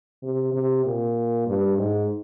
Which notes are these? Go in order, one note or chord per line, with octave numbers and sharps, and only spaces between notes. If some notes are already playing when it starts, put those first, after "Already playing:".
C3
C3
A#2
G2
G#2